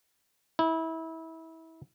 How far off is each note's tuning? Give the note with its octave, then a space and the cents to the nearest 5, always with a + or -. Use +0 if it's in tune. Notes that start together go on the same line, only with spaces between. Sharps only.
E4 -25